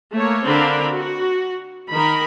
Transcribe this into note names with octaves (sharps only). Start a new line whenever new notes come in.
A3 A#3 C#5
D3 C4 D4 A#4 F5 B5
F#4
D#3 A#4 B5